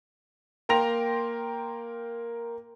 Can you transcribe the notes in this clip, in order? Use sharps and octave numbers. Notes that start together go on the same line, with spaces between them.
A#3 A#4 G5 C6 A#6 F7